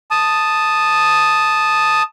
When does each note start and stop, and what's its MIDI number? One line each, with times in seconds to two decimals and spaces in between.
0.11 2.02 81
0.11 2.02 87